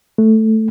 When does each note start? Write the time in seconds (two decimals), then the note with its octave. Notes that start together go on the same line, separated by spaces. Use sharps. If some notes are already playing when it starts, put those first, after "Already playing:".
0.18 A3